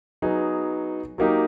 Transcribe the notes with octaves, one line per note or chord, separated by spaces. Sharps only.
F#3 B3 D#4 G#4
F#3 A#3 D#4 G4